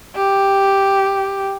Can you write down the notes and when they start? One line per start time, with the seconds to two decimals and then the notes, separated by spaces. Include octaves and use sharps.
0.15 G4